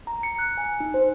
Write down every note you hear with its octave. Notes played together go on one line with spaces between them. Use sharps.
A#5
C#7
F#6
G#5
D#4
C5